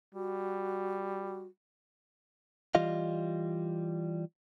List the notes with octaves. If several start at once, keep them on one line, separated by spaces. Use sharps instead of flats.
G3 F#4
E3 G3 F4 D#5 F5